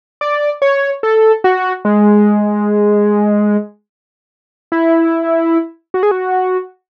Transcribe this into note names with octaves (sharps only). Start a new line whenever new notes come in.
D5
C#5
A4
F#4
G#3
E4
F#4
G#4
F#4